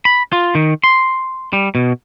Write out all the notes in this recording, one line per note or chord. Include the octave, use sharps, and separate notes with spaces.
B5
F4
D#3
C6
G3
B2